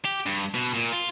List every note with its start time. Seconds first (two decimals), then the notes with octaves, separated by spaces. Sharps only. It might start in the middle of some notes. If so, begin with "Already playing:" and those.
0.05 G4
0.26 G2
0.54 B2
0.73 A#2
0.92 F4